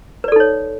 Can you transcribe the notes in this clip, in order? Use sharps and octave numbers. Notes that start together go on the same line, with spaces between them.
D#4 A4 B4 C#5 D5